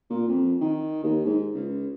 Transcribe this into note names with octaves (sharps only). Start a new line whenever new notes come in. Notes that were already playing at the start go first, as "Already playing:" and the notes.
A#2
F2
D#3
D#2
G#2
C#2